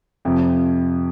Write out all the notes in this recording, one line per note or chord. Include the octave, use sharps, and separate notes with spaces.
F2 C3 F3